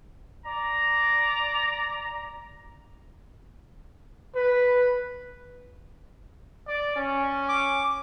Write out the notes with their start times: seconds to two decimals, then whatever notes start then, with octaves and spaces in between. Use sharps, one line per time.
0.45 D5 A#5
4.36 B4
6.67 D5
6.96 C#4
7.49 D6